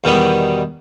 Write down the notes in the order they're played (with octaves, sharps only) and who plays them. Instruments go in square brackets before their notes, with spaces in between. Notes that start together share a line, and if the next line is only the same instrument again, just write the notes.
[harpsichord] E2 B2 D#3 G3 B3